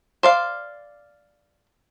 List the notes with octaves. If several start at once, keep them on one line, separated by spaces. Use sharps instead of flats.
C5 D5 F5